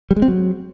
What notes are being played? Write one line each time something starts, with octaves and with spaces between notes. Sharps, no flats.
G3
G#3
C4
F#3